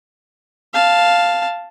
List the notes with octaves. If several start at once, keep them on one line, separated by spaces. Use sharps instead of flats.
F5 A5